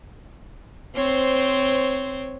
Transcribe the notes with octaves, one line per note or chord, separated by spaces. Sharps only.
C4 C5 C#5